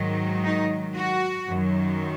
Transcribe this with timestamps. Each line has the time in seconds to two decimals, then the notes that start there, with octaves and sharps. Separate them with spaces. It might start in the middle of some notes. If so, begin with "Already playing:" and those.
Already playing: G#2 D#3 F#3
0.44 D#4
0.95 F#4
1.48 F#2 D#3 F#3